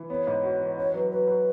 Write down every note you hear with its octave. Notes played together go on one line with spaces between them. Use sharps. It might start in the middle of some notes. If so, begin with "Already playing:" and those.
Already playing: E3
B3 C#5
G#2
F#4
E3
C#4 C#5
F#3 B4
F#3 B4
F#3